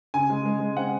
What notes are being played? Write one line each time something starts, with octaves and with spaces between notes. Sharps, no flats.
C#3 G#5
G#3
G#3
G#3
C4 F#5